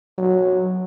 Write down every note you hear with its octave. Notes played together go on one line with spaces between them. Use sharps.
F#3